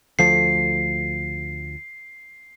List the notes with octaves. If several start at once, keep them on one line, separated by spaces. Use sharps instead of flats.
D2 F3 A3 C7